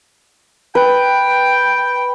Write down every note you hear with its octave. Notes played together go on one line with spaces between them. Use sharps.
B4 G5